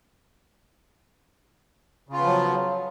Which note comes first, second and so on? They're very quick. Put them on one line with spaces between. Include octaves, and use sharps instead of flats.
C#3 F4 B3 F3 F#3